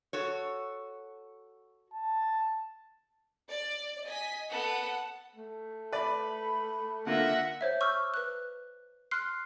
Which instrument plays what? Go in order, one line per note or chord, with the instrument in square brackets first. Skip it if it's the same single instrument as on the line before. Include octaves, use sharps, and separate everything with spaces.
[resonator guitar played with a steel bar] F#4 A4 C#5
[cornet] A5
[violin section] D5
D#5 G#5 B6
[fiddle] B3 A4 [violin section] F#5
[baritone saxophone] A3
[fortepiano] B4 D5 [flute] B5
[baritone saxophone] D3 [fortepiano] A#3 F4 [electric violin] E5 F#5 [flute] A#6
[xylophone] C5 C#5 E5
C#6 D6 E6 F6 G6
B4 F#6
C6 F6 F#6 C7